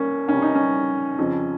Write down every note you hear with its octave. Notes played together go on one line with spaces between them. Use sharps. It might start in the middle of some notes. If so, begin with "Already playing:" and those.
Already playing: C2 G3 A#3 C#4
C2 C3 G3 C#4
D#4
C#4
F2 C#3 F3